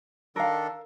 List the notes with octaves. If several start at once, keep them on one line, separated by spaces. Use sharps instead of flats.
D#3 D4 A4 A#4 F5